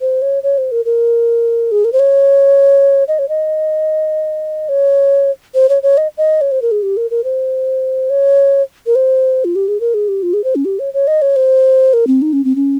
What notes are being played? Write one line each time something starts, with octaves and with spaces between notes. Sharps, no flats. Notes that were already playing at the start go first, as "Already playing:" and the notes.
C5
C#5
C#5
C5
A#4
A#4
G#4
A#4
C5
C#5
D#5
C#5
D#5
C#5
C5
C#5
C#5
D#5
D#5
C#5
C5
A#4
G#4
G4
A#4
A#4
C5
C#5
A#4
C5
F4
G4
G#4
A#4
G#4
G4
F4
G#4
C5
C#4
G4
C#5
C#5
D#5
C#5
C5
A#4
C4
D#4
C#4
C4
C#4